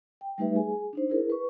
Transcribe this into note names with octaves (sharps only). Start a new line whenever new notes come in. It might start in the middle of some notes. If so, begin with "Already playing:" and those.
G5
G3 A3 D#4 G4 B4 E5
G#4 G#5
D4 D#4 C5
E4 G#4 A#4
B4 C#6